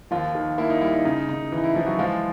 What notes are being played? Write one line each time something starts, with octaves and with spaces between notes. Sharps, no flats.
D#2 F3 F4
D#3
A#3 E4
D#4
G3 E4
D#4
C#3 D#4
C#3 D#4
E3
D#4
E4
E3 F3 F4
F#3 F#4
F3 G#3 F4